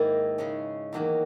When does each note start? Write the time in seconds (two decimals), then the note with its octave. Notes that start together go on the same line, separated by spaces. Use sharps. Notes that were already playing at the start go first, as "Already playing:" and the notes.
Already playing: G#2 D#3 A#3 E4 G#4
0.38 C#3 G#3 C#4
0.93 E2 D#3 F#3 A#3